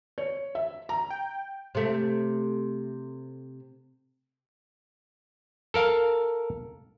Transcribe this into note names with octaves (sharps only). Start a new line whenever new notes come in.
C#5
E5
A#5
G5
C3 A3
A4 A#4 F5